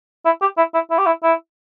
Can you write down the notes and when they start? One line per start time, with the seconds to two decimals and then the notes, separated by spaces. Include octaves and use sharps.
0.25 E4
0.42 G4
0.58 E4
0.74 E4
0.91 E4
0.98 G4
1.06 E4
1.23 E4